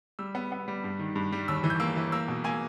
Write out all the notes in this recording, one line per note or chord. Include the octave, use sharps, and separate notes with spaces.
G3 E6
B3
B3
G3
G2
D#3
G2
G3
D#2 E6
E3
G6
A#3 E6
E3
A#3 E6
B2
A#3 G#5